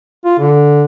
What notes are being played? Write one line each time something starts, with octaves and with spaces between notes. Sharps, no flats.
F4
D3